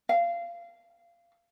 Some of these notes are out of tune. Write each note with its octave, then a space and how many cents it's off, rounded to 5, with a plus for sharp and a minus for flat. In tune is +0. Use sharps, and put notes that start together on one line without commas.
F5 -25